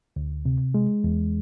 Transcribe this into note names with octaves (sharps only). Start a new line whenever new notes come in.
D2
C3
G#3
E2